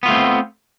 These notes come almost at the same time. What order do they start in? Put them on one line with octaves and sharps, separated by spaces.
B3 F4 A3 C4